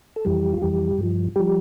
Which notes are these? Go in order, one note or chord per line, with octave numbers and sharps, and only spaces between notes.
A4
F2 E3 G3 G4
F4
F2 E3 G3 G4
G2 F3
F3 G3 G4